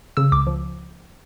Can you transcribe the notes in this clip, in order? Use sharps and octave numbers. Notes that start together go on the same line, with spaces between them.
C#3 E6
C#2 D6
F3